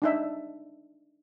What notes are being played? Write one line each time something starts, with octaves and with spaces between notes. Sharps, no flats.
D4 D#4 E5